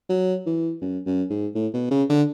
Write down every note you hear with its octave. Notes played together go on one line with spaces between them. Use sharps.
F#3
E3
F#2
F#2
G#2
A2
B2
C#3
D3